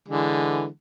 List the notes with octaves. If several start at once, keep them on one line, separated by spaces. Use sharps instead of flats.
D3 E3 G#3